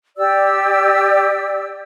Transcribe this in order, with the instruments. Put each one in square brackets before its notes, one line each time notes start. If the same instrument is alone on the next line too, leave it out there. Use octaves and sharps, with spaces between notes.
[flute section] G4 D5 E6